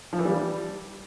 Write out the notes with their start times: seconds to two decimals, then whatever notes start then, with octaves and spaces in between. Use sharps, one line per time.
0.13 F3
0.19 E3
0.25 G3